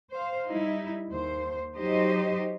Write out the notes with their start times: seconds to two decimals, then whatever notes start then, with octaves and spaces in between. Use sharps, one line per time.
0.12 C5 F5
0.49 G3 D#4 E4
1.11 D#2 C5
1.77 F#3 D#4 G4 C5 D#5